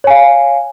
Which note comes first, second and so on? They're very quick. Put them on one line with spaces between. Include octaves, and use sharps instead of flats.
C#5 G#5 F5